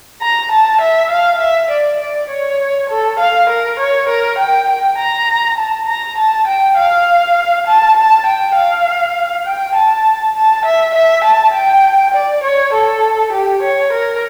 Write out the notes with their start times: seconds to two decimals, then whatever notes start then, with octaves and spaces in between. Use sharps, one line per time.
0.21 A#5
0.51 A5
0.81 E5
1.11 F5
1.41 E5
1.71 D5
2.00 D5
2.30 C#5
2.90 A4
3.19 F5
3.50 A#4
3.79 C#5
4.09 A#4
4.38 G5
4.69 G5
4.98 A#5
5.58 A5
5.88 A#5
6.18 A5
6.47 G5
6.78 F5
7.67 A5
7.97 A5
8.26 G5
8.56 F5
9.45 G5
9.75 A5
10.35 A5
10.65 E5
10.95 E5
11.24 A5
11.54 G5
12.14 D5
12.44 C#5
12.73 A4
13.33 G4
13.63 C#5
13.93 A#4